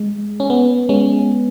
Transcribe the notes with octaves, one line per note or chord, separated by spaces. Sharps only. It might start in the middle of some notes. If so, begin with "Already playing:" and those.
Already playing: G#3
C#4
B3
G#3 C#4